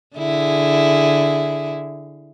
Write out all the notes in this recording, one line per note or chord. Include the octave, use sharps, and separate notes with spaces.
D3 E4 G#4